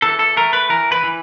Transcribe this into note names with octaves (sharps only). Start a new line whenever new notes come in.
E3 A4
A4
A3 A#4
B4
E3 A#4
B4
E3